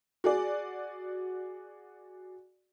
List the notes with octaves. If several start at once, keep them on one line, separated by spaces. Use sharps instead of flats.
F#4 G#4 D5